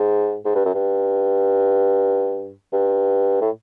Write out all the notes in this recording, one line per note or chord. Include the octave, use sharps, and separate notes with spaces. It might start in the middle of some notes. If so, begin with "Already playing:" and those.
Already playing: G#2
G#2
G2
F#2
G2
G2
A2